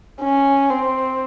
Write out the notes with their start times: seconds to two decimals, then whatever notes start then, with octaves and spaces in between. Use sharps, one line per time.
0.21 C#4
0.70 C4